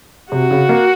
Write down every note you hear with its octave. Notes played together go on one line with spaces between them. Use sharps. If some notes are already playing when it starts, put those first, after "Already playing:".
C3 F#4
C#3
A#3